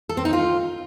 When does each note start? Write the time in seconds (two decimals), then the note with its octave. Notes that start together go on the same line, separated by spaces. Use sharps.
0.09 A4
0.17 C4
0.25 D#4
0.33 F4